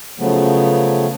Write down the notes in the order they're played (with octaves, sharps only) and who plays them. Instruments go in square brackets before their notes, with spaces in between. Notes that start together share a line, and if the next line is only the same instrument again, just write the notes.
[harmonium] C#3 F3 F#3 A3 B3